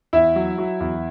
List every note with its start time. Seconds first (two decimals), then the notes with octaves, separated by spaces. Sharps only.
0.13 E2 E4 E5
0.36 F#3
0.58 F#3
0.80 E2